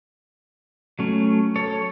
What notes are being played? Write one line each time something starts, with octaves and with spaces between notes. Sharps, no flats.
F#3 A3 C#4
A4 C#5